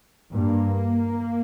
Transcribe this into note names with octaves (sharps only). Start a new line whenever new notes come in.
G2 A#3